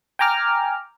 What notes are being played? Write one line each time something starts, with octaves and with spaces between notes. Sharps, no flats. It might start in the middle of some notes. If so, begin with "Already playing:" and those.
G5 G#5 A#5 D6 F6